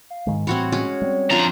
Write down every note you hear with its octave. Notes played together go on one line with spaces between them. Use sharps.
F5
G#2 D#3 G#3
A2 E3 G3 C4 F#4 C#5 B5
G#3 C#4 F#4 C#5
G3 C4
F2 D4 F4 C5 A#5